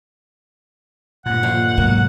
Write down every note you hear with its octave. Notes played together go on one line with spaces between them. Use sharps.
G2 A#2 F#5
D#2 D3 F3
C2 G#2 B2 F#3 A#3